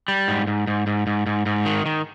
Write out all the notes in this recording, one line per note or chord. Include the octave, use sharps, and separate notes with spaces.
G3
G#2
G#2
G#2
G#2
G#2
G#2
G#2
D#3
D#3